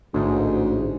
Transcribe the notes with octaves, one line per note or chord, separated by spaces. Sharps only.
A1 D2 G#2